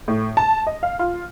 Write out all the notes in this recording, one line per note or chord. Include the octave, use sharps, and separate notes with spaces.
A2
A5
D#5
F5
F4